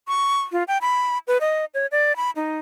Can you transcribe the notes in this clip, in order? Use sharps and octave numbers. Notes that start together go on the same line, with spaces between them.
C#6
F4
G5
B5
B4
D#5
C#5
D5
B5
D#4